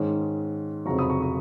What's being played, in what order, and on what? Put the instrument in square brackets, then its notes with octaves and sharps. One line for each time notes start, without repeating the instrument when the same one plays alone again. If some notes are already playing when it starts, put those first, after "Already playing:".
Already playing: [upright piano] G#2 D#3 G#3 C#4
F1 F2 C#3 F#3 A#5 C#6
B5 D#6
A#5 C#6
A#5 C#6